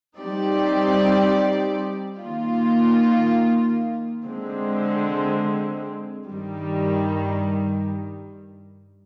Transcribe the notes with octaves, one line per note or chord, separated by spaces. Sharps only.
G3 C4 D#4 G4 D5
D#3 A#3 F4
D3 G#3 C4
G2 D#3 G3